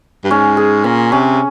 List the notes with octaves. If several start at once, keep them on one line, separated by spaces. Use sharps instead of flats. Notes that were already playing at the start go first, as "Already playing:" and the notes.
G2
G#2 C#4
G#4
A#2 C#4
C3 C#4